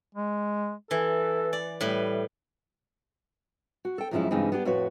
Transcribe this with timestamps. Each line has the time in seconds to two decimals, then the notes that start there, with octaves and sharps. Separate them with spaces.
0.15 G#3
0.91 E3 A4
1.53 D5
1.81 A2 G3 B4
3.85 F#4
3.98 A4 G5
4.11 F#2 C3 F3 G#3 C#4 E4
4.31 G2 C#3 E3 G#3 C4 D#4
4.52 B3 D4 G4
4.65 F2 A2 F#4 B4 C#5